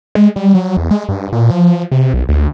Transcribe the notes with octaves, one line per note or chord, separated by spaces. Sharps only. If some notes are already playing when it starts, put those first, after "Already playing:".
G#3
G3
F#3
E2
G#3
G2
A#2
F3
C3
B1
D2